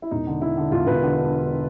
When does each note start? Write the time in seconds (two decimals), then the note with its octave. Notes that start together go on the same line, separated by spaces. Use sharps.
0.02 E4
0.11 E1 D#4
0.27 D3
0.41 D3 E4
0.58 D3
0.72 E1 F4
0.87 E1 B4
1.03 D3